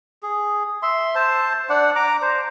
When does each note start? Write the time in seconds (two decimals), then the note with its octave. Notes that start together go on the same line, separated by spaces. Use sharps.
0.23 G#4
0.83 E5 C6
1.15 C5 A5
1.69 D4 D5 F#5
1.96 A#5 D6
2.22 C5